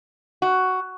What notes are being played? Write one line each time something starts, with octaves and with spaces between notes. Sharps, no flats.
F#4